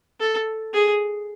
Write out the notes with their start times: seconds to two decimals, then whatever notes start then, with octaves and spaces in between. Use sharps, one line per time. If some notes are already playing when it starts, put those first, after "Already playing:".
0.20 A4
0.74 G#4